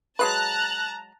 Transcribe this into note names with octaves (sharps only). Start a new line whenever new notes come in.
F#3 G#3 B4 A5 A#5 F#6